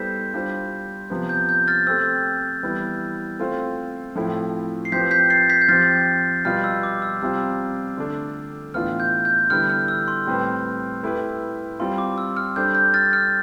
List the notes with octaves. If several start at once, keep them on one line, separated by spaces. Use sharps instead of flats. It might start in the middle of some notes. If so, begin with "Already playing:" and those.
Already playing: G3 B3 E4 A4 C5 G6 B6
G3 D4 F4 C5
C3 F3 B3
G6
G6
F6 A6
A3 C4 G4 C5 E6
E3 G3 B3 E4
A3 C4 F4 C5
A2 F3 A3 C4 E4
C7
F3 C4 G4 B4 G6 B6
G6 B6
A6 C7
G6 B6
G6
F3 C4 G4 F6 A6
B2 G3 B3 F4 F6
E6
D6
E6
C3 G3 C4 F4 E6
D3 A3 D4
A2 E3 B3 D4 F4 F6
G6
G6
D3 G3 B3 E4 F6
F6
E6
C6
A2 G3 C4 G4 B4
A3 E4 G4 B4
G3 C4 F4 C6
D6
E6
F6
G3 D4 A4 C5 G6
G6
F6 A6
F6